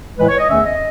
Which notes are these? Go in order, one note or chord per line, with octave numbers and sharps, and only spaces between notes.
A2 E3 G#3 B4
C#5
D#5
E2 D#3 A3 C#4 E5
D#5